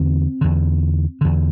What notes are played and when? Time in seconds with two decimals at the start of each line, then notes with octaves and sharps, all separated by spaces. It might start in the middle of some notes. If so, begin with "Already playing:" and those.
Already playing: E2 D3 C4
0.41 E2 D3
1.21 E2 D3